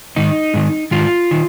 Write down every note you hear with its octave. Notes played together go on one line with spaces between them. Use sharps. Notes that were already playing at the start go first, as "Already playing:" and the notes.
G#2 D#3 D#4
G#2 D#3
G#2 D#3 F4
D#3